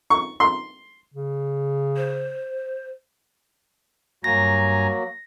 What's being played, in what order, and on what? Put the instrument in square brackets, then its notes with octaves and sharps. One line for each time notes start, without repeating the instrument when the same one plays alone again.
[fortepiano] C#6
C6
[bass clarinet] C#3
[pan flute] C5
[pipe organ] G2 G#5 A#5 [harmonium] F#3 A#3 F#4 [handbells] A#6